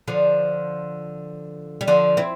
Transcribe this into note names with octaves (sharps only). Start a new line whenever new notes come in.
D3 F3
G3
D3 F3
C4 E4